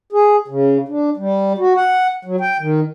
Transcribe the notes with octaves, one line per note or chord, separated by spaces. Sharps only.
G#4
C#3
D4
G3
F#4
F#5
F#3
G5
D#3